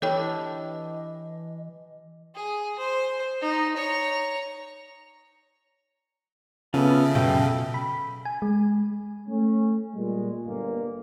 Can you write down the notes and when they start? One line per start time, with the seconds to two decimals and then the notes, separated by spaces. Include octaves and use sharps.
0.02 E3 D4 E4 G4 A4 C#5 D#5 G5
2.35 G#4
2.79 C5
3.42 D#4
3.76 C#5 A#5
6.74 C#3 B3 C#4 F4 A4 E5
7.15 F#2 B2 F4 G5
7.74 B5
8.25 G#5
8.42 G#3
9.28 A3 C#4
9.95 A#2 G3 G#3
10.46 G1 A#3